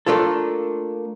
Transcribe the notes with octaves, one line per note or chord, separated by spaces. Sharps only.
A3 A#3 D4 F4 A4